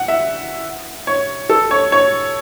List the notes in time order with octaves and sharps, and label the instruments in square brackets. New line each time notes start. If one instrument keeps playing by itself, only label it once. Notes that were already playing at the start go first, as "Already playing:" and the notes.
Already playing: [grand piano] F#5
E5
C#5
A4
C#5
C#5